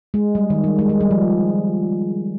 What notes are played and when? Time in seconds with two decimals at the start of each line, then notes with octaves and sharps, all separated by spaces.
0.14 G#3
0.35 G3
0.50 D#3
0.64 G3
0.79 G#3
0.89 G#3
1.00 G3
1.11 F3